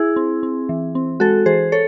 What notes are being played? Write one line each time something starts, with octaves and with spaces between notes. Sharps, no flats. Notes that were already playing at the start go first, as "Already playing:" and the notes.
Already playing: E4 G#4
C4
C4
E3
C4
G#3 F#4 A4
E3 G#4 C5
A4 C#5